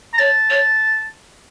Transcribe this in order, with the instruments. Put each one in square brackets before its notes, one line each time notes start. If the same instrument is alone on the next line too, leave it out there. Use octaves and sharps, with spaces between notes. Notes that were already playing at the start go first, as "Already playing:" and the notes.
[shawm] A#5
[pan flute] C#5 [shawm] A5
[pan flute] C#5